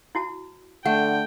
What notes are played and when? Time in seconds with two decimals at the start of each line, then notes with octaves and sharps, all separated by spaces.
0.15 E4 F#4 A5
0.85 D3 A3 F#5 G5